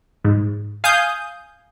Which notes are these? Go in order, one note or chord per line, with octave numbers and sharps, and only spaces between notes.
G#2
F5 G#5 D#6 G6